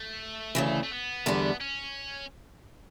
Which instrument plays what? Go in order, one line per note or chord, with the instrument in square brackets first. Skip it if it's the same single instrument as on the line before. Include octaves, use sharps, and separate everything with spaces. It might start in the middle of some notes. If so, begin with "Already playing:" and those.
Already playing: [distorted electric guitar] A3
[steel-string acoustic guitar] D2 C#3 E3
[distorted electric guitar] A3
B3
[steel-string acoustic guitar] E2 D3 G3
[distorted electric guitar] C#4